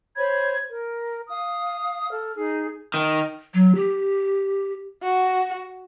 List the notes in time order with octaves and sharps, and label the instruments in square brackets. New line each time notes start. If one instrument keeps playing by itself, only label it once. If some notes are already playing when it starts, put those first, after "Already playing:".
[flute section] C5 C#5 B5 G#6
A#4
F5 D#6
A4 F6
D#4 G#4
[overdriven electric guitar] D#3
[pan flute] F#3
G4
[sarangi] F#4